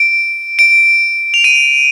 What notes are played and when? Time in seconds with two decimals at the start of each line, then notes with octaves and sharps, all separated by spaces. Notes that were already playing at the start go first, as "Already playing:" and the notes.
Already playing: D7
0.59 D7
1.34 F7
1.44 D#7